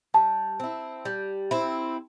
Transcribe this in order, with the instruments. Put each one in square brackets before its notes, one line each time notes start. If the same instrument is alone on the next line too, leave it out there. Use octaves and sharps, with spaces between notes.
[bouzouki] G3 [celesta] A5
[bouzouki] C4 E4
G3
C4 E4